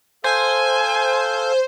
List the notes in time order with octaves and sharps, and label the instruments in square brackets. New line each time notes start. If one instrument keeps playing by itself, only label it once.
[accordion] A4 F5 [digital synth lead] C5 [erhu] G#5